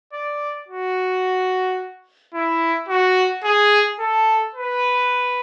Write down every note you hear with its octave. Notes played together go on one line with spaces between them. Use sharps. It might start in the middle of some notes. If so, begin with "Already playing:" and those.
D5
F#4
E4
F#4
G#4
A4
B4